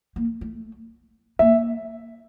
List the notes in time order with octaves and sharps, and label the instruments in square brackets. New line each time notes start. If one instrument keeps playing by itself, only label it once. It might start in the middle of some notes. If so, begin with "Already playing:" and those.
[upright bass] A#3
A3
[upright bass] A#3 [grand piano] E5